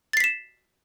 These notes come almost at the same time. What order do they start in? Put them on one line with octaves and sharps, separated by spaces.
A6 C7 B6 E7